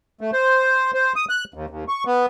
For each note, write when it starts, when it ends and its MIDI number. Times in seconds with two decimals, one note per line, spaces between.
0.21 0.31 57
0.33 0.91 72
0.94 1.13 72
1.16 1.25 87
1.29 1.44 90
1.54 1.66 39
1.70 1.84 39
1.88 2.04 85
2.06 2.26 59